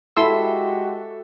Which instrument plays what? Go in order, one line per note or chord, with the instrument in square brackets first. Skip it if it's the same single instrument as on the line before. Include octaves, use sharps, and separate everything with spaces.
[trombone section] G#3 F#4 G4 [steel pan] E4 C6 E6 [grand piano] A4 E5